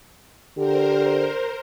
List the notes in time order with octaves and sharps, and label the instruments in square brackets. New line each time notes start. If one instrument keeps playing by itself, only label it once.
[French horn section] D3 G4 [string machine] A#4 C5